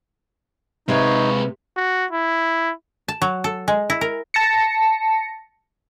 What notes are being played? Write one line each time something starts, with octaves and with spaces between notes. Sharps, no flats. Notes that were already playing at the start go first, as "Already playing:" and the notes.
C3 G#3 B3 D#4 B4 C#5 F5
F#4
E4
A5
F#3
A4
G#3
E4
A#4
A5 A#6 C#7